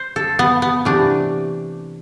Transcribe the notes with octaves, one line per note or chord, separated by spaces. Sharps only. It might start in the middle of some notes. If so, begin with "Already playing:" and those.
Already playing: C5
A4
B3
B3
C3 E3 A3 D4